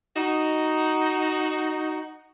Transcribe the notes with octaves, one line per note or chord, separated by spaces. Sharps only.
D#4 F#4